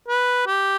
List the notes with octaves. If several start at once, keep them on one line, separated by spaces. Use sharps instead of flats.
B4
G4